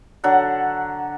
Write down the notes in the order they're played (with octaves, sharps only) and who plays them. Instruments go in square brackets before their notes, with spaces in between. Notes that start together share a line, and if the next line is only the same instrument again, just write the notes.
[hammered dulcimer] D3 F#3 A4 F#5